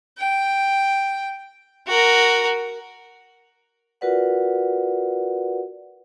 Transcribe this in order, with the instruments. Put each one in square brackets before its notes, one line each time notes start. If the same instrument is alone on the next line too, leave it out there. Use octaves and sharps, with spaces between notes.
[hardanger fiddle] G5
F#4 A#4
[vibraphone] F4 F#4 A#4 B4 D5 F#5